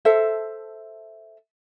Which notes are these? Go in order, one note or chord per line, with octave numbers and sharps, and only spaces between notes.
A4 C5 E5